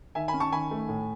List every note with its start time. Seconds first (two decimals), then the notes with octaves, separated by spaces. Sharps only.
0.15 D#3 E5 G#5
0.28 G#5 B5
0.33 C#4
0.40 A5 C#6
0.52 D#3 G#5 B5
0.71 A3
0.89 A2